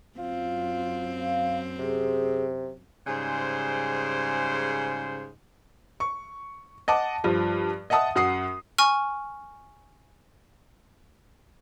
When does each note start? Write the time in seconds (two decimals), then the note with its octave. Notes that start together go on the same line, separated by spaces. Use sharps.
0.18 F#2 C4 F4
1.19 F5
1.79 C3 G#4
3.06 G#2 C#3 G3 G#4 C5
6.00 C#6
6.88 D#5 F#5 A5 D6
7.24 G2 F3
7.90 D#5 E5 F#5 A5 D#6
8.16 F#2 F#5 D#6 C7
8.78 G#5 C#6 F6